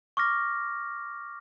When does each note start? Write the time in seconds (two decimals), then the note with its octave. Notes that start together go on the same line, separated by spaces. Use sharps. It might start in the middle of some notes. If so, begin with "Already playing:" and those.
0.17 C#6 D6 F6 A#6